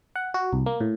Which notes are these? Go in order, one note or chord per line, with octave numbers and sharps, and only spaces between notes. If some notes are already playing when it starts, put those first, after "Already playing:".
F#5
F#4
C2
A#3
A2